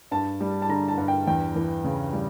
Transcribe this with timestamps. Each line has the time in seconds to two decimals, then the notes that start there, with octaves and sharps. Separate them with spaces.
0.11 G2 A5
0.40 G3
0.62 A5
0.69 D3 A#5
0.88 A5
0.98 G2
1.08 G5
1.27 E2 G5
1.56 E3
1.84 C#3
2.13 G3